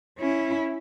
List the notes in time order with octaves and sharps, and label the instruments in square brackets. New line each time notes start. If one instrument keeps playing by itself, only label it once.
[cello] C#4 E4